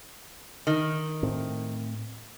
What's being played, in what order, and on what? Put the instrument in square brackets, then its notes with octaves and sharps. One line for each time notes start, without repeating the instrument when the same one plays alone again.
[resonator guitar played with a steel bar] D#3
[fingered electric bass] A2 A3 C4